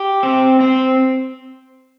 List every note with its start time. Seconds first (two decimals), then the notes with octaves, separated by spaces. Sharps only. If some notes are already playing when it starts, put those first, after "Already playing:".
Already playing: G4
0.23 C4
0.60 C4